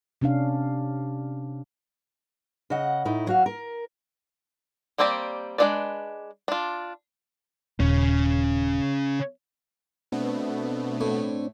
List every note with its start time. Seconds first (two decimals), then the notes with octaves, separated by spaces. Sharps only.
0.21 C3 C#4 D4 F5
2.70 C#3 D#5 F#5
3.05 A2 D#4 E4
3.26 F#3 F#4 F5
3.46 A#4
4.98 G3 A#3 C4 G4 D5
5.58 G#3 B3 D4 B4 D5
6.48 D4 F4
7.80 D#1 C#3 C#4
10.12 B2 A3 B3 C4 D4
11.01 A2